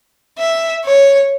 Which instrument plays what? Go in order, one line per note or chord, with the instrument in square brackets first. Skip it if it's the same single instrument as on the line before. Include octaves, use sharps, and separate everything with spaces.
[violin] E5
C#5